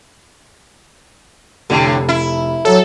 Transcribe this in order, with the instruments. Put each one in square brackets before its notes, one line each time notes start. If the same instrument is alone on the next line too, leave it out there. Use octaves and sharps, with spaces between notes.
[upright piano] F1 A4 [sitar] A2 D3
[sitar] E4
[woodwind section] F#3 [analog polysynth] A4